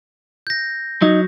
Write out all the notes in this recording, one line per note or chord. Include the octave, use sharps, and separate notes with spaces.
G6 A#6
F#3 D#4